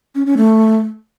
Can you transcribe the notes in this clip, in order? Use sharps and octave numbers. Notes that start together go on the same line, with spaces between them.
C#4
C#4
A3